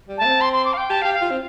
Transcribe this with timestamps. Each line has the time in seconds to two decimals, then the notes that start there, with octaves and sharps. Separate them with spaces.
0.09 G3
0.18 A3 A5
0.25 C4
0.41 C6
0.53 C6
0.65 D6
0.73 F5
0.77 G5
0.90 G4 A5
1.02 G4 F5
1.14 F5
1.21 F4
1.31 C4